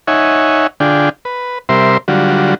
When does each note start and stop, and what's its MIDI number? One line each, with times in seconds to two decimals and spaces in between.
0.08 0.67 63
0.08 0.67 73
0.08 0.67 76
0.08 0.67 78
0.08 0.67 80
0.80 1.09 50
0.80 1.09 62
0.80 1.09 65
0.80 1.09 68
0.80 1.09 79
1.25 1.58 71
1.69 1.97 48
1.69 1.97 55
1.69 1.97 70
1.69 1.97 72
1.69 1.97 76
1.69 1.97 84
2.08 2.55 50
2.08 2.55 54
2.08 2.55 55
2.08 2.55 65
2.08 2.55 66